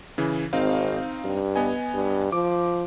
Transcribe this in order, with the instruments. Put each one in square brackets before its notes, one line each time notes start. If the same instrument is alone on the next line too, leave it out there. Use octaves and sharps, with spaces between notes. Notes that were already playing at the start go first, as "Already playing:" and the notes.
[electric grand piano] C#3 E3
[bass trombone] G#1 [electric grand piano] C4 D#4 F5
[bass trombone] G2
[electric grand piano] B3 D#5 G#5
[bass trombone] G2
[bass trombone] F3 [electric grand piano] D6